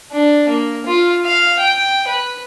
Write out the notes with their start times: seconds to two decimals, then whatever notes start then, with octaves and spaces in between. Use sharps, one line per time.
0.12 D4
0.49 A#3
0.86 F4
1.25 F5
1.59 G5
2.08 B4